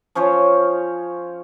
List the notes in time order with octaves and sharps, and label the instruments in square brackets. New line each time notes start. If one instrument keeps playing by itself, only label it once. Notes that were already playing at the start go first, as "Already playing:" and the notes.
[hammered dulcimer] F3 C#4 C5 C#5